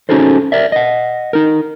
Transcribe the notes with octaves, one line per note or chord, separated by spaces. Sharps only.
C#4 D#4 F#4 G#4 A4 C5
A#4 D5 E5
D#5 F#5
D#4 A#4